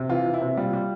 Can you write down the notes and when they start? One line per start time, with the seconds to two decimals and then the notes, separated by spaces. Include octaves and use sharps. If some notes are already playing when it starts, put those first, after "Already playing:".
Already playing: C3
0.09 E3 F4
0.25 E3
0.34 E4
0.41 C3
0.57 G3 F4
0.73 G3